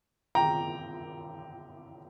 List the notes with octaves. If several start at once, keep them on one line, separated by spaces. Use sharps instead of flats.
G5 A#5